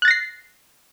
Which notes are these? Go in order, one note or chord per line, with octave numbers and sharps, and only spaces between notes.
F#6 A6 A#6 C7